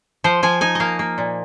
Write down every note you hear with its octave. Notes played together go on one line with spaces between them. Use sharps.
F3 C5
F3 G#5
D#4 G#5
A#3 D#5 F5
A#3
A#2